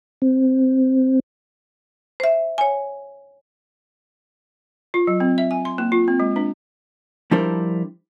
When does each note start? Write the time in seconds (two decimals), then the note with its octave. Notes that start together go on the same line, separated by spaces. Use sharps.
0.22 C4
2.20 C5 E5
2.58 C#5 G#5
4.94 F4
5.07 F#3
5.20 C4
5.38 E5
5.51 G#5
5.65 C6
5.78 A#3
5.92 F4
6.08 C4
6.20 G#3
6.36 D4
7.31 F3 G3 D4 E4 A#4 C5